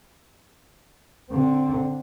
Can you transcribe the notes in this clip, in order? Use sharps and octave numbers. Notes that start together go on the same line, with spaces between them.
D3 C4